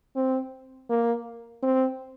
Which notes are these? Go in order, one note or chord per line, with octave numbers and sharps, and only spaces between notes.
C4
A#3
C4